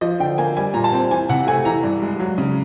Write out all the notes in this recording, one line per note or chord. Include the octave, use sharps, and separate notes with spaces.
F3 D#5
D3 G5
A#3 G#5
G3 G#5
A#2 A#5
A5
C4
E3 G#5
C3 F#5
A3 G#5
E3 A#5
G2
G#3
F#3
C#3